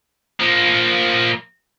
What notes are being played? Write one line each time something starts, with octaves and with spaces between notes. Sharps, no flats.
F3 A#3